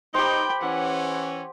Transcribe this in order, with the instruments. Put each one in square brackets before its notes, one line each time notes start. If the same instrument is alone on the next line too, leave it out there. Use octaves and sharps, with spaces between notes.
[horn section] D#4 [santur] G4 C5 [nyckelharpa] G5 B5
[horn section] E3 C#4 [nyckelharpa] F#5